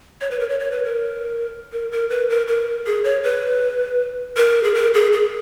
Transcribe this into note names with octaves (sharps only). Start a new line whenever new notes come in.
C#5
B4
A#4
C#5
C#5
B4
A#4
A#4
A#4
B4
A#4
A#4
G#4
C#5
B4
A#4
G#4
A#4
G#4
G#4